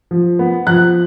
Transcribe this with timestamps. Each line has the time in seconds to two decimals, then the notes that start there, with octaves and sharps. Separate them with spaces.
0.11 F3
0.39 B3
0.67 F3 F#6